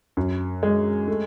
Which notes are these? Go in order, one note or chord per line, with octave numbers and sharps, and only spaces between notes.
F#2
G#3
A3